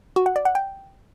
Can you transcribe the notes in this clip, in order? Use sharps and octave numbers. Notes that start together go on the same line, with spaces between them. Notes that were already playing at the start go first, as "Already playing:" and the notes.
F#4
F#5
D5
F#5
G5